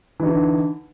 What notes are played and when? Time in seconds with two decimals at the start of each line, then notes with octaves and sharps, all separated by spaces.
0.20 E3
0.23 D#4
0.26 D3